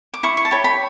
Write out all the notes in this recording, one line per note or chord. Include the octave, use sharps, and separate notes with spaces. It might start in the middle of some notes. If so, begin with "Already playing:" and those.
D6
E4 C#6
C#6
A5
G4 C#5 B5
B5